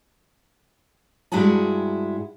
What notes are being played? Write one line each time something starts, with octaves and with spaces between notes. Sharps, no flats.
G2 G#3 E4 F#4 G#4 A5